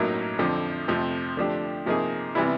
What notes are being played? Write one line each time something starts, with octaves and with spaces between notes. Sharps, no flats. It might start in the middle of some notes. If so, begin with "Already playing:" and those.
Already playing: A1 A2 F#3 A#3 D#4
F2 D3 F3
F2 C3 F3 A3
D3 F3 A3 D4 G4
C3 F3 A#3 D#4 G#4
C3 E3 G3 B3 E4